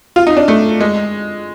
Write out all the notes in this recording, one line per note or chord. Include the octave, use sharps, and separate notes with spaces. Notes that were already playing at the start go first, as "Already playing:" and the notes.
F4
D#4
D4
A3
G#3